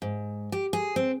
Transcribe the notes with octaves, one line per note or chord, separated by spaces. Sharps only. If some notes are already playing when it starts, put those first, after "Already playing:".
G#2
G4
G#4
C4